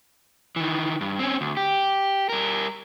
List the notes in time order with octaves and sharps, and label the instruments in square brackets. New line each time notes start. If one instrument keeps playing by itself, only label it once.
[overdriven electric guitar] D#3 E3
G2
C4 C#4
D2
G4
G3 A#4